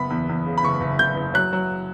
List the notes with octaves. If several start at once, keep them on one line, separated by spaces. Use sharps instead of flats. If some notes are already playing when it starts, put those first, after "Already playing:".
Already playing: F#1 B3 B5
E2
E2
C#3
B5
F#1 C#6
F#1
F#1 G6
F#1
F#3 F#6
F#3